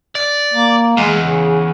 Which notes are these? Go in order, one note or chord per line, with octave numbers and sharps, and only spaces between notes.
D5
A#3
E2 G#3
C#3